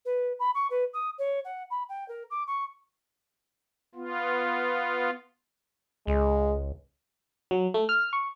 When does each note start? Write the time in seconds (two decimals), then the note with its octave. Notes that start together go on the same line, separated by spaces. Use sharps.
0.05 B4
0.39 B5
0.54 C#6
0.70 B4
0.93 D#6
1.18 C#5
1.44 F#5
1.70 B5
1.89 G5
2.08 A#4
2.30 D6
2.47 C#6
3.95 B3 F4
6.07 C#2 G#3
7.51 F#3
7.74 A3
7.89 F6
8.13 C#6